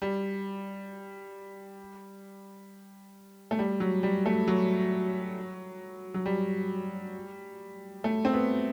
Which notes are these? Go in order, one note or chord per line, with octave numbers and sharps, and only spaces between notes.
G3
A3
G3
F#3
G3
A3
F#3
F#3
G3
A3
C4
B3